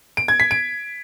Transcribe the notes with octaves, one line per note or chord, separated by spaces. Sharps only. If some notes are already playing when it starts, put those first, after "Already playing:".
D7
G#6
B6
D7